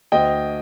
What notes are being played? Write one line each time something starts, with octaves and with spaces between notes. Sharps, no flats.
D2 D#5 G5